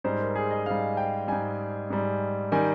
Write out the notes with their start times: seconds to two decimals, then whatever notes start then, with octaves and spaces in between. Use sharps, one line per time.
0.04 G#2 G3 C5
0.20 A#4
0.35 G#4
0.51 D#5
0.66 G#2 G3 F5
0.97 G5
1.28 G#2 G3 G#5
1.90 G#2 G3
2.52 D#3 G3 G#5